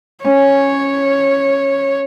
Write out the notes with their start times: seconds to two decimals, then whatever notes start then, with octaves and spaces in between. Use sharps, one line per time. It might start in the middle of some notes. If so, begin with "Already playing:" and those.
0.25 C#4 C#5